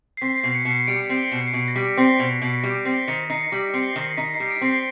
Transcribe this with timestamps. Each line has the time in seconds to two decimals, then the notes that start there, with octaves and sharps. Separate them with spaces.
0.17 C7
0.21 C4 B6
0.38 C7
0.43 B2
0.54 C#7
0.65 B2 C#7
0.71 C7
0.87 G3 D7
0.99 C#7
1.09 C4 C7
1.23 C#7
1.32 B2
1.47 C7
1.54 B2 C#7
1.68 A#6
1.75 G3 B6
1.97 C4 C7
2.19 B2 C7
2.42 B2
2.53 B6
2.61 A#6
2.64 G3 B6
2.85 C4 C7
3.08 D#3 C#7
3.30 D#4 C7
3.52 G3
3.74 C4
3.96 D#3
4.17 D#4 B6
4.34 C7
4.40 G3
4.51 D7
4.61 C4
4.67 C7